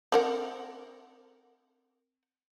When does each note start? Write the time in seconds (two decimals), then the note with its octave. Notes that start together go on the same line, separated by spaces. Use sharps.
0.12 C4 A#4 F#5